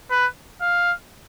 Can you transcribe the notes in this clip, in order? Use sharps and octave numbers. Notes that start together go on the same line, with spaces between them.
B4
F5